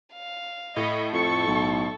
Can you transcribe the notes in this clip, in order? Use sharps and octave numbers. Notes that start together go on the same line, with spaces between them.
F5
A2 D#5 B5 C#6
F2 A4 C#6
B1